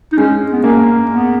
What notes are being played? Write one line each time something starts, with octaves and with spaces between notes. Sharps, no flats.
D#4
G#3 C#4
B3
A#3 C#4
B3